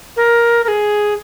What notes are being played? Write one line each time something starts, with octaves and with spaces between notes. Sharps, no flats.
A#4
A#4
G#4